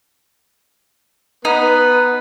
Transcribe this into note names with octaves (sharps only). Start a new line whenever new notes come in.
B3 D#4 B4